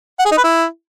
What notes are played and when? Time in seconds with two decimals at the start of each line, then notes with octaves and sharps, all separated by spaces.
0.19 F#5
0.25 G#4
0.31 D#4
0.38 B4
0.44 E4